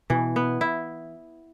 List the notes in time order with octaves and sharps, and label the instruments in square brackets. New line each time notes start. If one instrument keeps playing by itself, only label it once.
[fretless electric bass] B2 [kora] E3
[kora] B3
E4